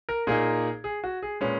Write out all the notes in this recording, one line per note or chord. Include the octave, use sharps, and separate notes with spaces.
A#4
A#2 A#3 D#4 G#4
G#4
F#4
G#4
A#2 G#3 C#4 B4